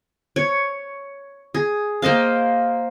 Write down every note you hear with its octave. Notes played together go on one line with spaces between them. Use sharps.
C#5
G#4
A#3 C5 D#5 F5